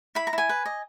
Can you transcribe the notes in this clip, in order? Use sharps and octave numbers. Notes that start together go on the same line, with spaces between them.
E4 B5
A#5
E4 G#5
B4
D#5